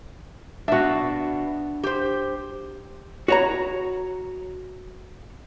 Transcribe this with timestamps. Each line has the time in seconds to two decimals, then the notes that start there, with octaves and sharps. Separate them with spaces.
0.68 B2 D4 F#4 E5
1.84 G4 C5
3.28 F#4 C#5 A#5